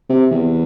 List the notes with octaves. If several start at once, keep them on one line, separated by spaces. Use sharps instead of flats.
C3
E2